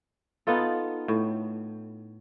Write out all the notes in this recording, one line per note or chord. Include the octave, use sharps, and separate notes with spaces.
B3 D#4 F4 A4
A2